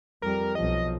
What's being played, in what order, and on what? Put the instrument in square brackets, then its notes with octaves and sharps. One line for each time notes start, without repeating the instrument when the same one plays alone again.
[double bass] F2 G3 [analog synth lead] A#4
[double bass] B1 F3 [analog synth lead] D#5